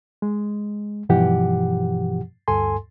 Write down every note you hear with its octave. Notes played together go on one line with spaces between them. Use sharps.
G#3
G2 B2 E3 F3 G4 F#5
D2 G2 A4 G#5 C6